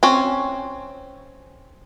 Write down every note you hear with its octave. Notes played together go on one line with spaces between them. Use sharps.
C4 C#4